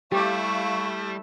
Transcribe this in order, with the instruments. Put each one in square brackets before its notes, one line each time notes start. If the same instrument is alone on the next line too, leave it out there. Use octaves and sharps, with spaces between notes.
[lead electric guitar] G3 [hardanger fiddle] A3 E4 [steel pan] G4 [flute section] F5 C#6